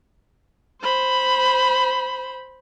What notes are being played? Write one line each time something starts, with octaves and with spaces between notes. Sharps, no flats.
C5 B5